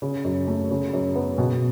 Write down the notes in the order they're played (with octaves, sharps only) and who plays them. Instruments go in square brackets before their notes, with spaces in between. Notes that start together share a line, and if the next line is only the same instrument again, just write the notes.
[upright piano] C#3
F#2
A3
C#3
F#2
B3
B2